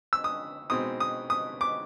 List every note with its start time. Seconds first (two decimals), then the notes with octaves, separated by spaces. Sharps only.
0.13 E6
0.24 D#6
0.70 B2 G#3 C4 D#4 D#6
1.00 D#6
1.30 D#6
1.61 D6